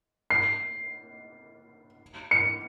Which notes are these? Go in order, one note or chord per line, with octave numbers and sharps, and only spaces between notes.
C7
C#7